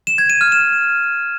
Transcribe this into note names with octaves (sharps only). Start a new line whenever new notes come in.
E7
G#6
D#7
F6
E7